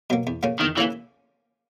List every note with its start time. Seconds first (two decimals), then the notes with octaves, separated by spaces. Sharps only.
0.10 B2 F#3 A#3
0.27 E2
0.43 C#3 F3 A#3 C#4
0.60 E2 D#3
0.78 C#3 E3 F3 A#3 C#4